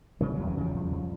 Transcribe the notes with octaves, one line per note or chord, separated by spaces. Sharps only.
C#3 G3 A3
F#3 G#3
E2
E3 F#3
C#3 F3 G3
F2
F2